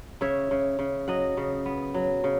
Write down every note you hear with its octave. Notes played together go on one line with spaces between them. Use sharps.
C#3 C#5 E5
C#3
C#3
F#3 D#5 F#5
C#3
B3
F#3
C#3